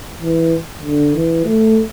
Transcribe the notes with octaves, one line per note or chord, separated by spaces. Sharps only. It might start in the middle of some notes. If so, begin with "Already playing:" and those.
E3
D3
E3
A3